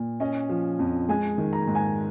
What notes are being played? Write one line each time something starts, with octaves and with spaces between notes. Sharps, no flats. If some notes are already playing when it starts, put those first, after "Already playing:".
Already playing: A#2
C#4 D#5
F3
F2
G#3 G#5
D#3
A#5
G#2
G#5